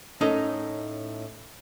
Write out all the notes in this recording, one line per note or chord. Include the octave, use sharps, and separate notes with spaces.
A2 C#4 D#4 A4 A#4 D#5